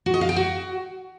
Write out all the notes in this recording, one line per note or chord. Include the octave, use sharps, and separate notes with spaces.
F#4
D#5
F5
G5
F#4